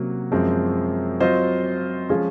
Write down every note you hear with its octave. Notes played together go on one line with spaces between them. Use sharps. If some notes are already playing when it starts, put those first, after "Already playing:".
Already playing: C3 F#3 A#3 C#4 F#4
F#2 F3 G#3 C4
F#3 C4 F4 C5 D#5
F3 G#3 C#4 F4 G#4